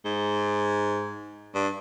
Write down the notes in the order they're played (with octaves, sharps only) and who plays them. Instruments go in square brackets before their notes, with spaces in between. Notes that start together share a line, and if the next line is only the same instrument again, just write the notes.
[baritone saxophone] G#2
G2